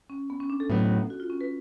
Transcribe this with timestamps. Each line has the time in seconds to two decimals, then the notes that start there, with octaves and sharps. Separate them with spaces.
0.10 C#4
0.30 B3
0.40 C#4
0.50 D4
0.60 A4
0.70 A2 F#3 B3
1.10 F#4
1.20 F4
1.30 C#4
1.41 B4